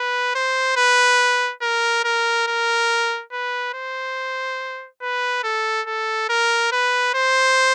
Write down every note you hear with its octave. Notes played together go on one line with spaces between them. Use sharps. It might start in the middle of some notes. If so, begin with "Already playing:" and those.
Already playing: B4
C5
B4
A#4
A#4
A#4
B4
C5
B4
A4
A4
A#4
B4
C5